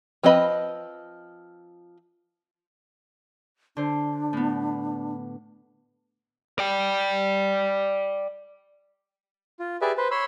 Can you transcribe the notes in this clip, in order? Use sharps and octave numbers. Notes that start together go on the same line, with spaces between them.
F3 C4 B4 D#5 B5
D3 D4 C5
A2 B3
D5 G5
F4
G4 G#4 B4 D5 E5
B4 C5
C#5 B5 C6 E6